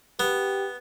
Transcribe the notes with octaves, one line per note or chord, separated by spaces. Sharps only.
B3 G4